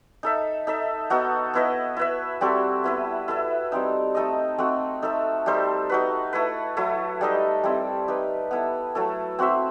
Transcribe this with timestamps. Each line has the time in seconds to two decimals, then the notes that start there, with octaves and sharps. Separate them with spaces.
0.23 D#4 A4 E5
0.67 D#4 A4 E5
1.10 B3 D#4 F#4 A4
1.54 B3 E4 B4 D#5
1.97 E4 B4 E5
2.41 G3 C4 F#4 A4
2.84 B3 E4 B4
3.28 E4 A4 E5
3.72 G3 C4 D#4
4.15 A3 D#4 A4 D#5
4.58 A3 C4 F#4 A4
5.02 D#4 A4 E5
5.46 G3 D#4 A4 C5
5.90 D#4 F#4 B4
6.33 A3 E4 B4
6.77 F#3 A3 E4
7.21 G3 D#4 A4 D#5
7.64 G3 C4 E4
8.08 D#4 G4 B4
8.51 B3 E4 A4
8.95 F#3 A3 E4 A4
9.39 C4 F#4 C5 E5